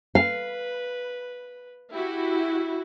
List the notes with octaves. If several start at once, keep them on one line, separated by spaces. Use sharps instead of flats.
B4 F5
E4 F#4 G4